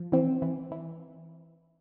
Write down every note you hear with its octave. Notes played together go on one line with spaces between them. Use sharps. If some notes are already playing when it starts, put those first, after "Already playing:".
Already playing: F3
E3 C4
E3
E3